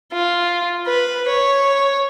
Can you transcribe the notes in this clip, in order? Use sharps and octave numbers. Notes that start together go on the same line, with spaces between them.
F4
B4
C#5